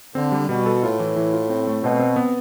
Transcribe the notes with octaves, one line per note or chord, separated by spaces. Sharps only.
D3 C4
G3
B2 G3
A4
A2 F4
E3
E3
F4
C4
A3
B2 C4
C4
B3